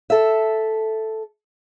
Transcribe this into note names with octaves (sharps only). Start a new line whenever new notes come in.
A4 E5